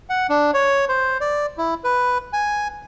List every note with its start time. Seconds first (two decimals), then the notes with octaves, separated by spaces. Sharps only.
0.10 F#5
0.30 D4
0.54 C#5
0.89 C5
1.21 D5
1.58 E4
1.84 B4
2.33 G#5